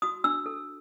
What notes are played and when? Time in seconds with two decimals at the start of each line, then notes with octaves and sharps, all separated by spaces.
0.02 F#4 D#6
0.24 D4 E6
0.46 A4